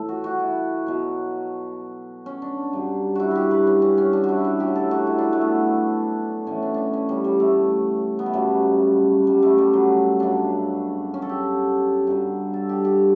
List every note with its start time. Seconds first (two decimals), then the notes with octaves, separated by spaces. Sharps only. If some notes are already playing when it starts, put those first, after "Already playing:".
Already playing: A2 E3 A4
0.09 F#4
0.24 F#4
0.40 E4
0.87 B2 F#3
2.26 C#4
2.42 D4
2.73 G2 F#3
3.16 E4 F#4
3.31 F#4 G4
3.51 B4
3.67 C#4
3.82 C#4
3.98 C#4
4.13 D4
4.24 F#4
4.29 E4
4.45 F#4
4.60 A2 F#3 G4
4.75 A4
4.91 F#4
5.07 E4
5.18 D4
5.33 A3
5.41 B3
6.47 A2 E3 C#4
6.63 D4
6.74 C#4 D4
6.93 C#4
7.09 G3
7.24 G3
7.40 A3
8.19 B3
8.26 A3
8.33 F#2 C#3 F#3 G3
9.27 G3
9.43 A3
9.58 G3
9.73 F#3
10.20 F#2 C#3 F#3 D4
11.14 C#4
11.22 A4
11.29 G4
12.07 G2 D3 F#3
12.54 A4
12.69 G4
12.85 G4